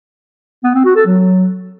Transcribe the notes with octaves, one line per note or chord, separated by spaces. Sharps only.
B3
C4
F#4
A4
F#3